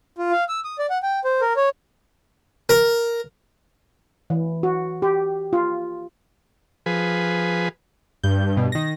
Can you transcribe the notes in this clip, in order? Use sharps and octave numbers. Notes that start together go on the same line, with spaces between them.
F4
F5
E6
D#6
D5
F#5
G5
C5
A#4
C#5
A#4
E3
F#4
G4
F4
F3 G#4 B4
G2 G6
B2
D#3 A#6